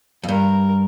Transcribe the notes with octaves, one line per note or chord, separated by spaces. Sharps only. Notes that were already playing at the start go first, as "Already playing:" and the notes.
F2
G2 A#4